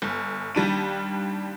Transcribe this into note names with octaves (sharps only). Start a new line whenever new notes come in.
G1
D#2 G3 D4 D#7